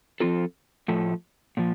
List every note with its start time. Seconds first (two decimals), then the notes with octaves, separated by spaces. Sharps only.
0.20 F3 C4 F4 A4
0.88 A2 F3 A3
1.57 A#2 F3